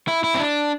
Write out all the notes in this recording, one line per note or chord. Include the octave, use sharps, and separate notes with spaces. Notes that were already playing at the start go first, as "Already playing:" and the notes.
E4
E4
C4
D4